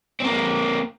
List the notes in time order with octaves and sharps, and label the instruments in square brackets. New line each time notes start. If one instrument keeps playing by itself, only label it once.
[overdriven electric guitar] A#3 C4